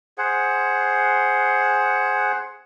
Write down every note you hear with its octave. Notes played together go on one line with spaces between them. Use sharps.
G#4 C5 F#5